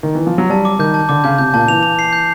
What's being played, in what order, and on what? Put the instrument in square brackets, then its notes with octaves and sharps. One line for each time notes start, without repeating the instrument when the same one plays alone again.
[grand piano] D#3
E3
F3
F#3
[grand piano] G3 [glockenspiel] A5
[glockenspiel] D6
[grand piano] D#3 [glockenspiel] G6
[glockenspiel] A5
[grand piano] D3 [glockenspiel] D6
[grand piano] C#3 [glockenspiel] G6
[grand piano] C3 [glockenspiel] G6
[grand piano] A#2 [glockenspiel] A5
[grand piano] E3 [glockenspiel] F7
[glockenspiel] F7
C7
G6